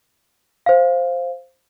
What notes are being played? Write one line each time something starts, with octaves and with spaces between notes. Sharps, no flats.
C5 F5